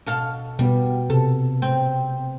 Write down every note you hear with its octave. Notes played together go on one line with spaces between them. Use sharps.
B2 A4 F5
B2 G3 B3
C3 A4
C4